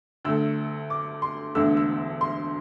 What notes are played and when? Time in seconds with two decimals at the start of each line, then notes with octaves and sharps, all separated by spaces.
0.25 D2 D3 A3 E6
0.90 D6
1.22 C6
1.55 E1 D2 D3 A3 E6
1.77 E6
2.21 C6